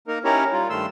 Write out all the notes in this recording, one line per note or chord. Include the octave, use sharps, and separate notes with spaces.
A#3 D#4 A#4
C#4 D#4 E4 G4 A#4 C#5
G3 F4
G2 D#3 G3 A3 C6 E6